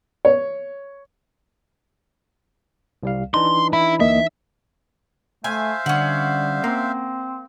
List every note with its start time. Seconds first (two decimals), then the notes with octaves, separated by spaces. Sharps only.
0.25 C#5
3.03 C2 G3 F5
3.34 E3 D4 D#4 C6
3.73 E4 B5
4.00 D2 A#3 D#5 E5
5.44 A3 C5 E5 F5 G#5
5.86 D3 G3 C#4 F#5
6.64 A#3 C4